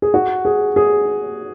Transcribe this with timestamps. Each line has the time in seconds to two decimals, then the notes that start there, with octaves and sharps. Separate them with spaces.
0.02 G#4
0.14 F#4
0.45 G#4
0.76 G#4